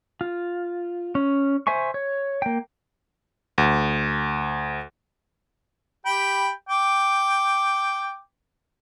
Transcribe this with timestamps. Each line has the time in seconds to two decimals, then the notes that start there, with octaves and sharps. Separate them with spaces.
0.21 F4
1.15 C#4
1.67 C5 E5 G#5 C#6
1.94 C#5
2.42 A#3 G5
3.58 D2
6.06 G4 G5 B5
6.69 G5 D6